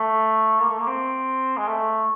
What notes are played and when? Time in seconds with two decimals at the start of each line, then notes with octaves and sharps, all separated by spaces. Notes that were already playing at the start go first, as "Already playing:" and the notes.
Already playing: A3
0.60 A#3
0.69 A3
0.79 A#3
0.87 C4
1.57 G#3
1.68 A3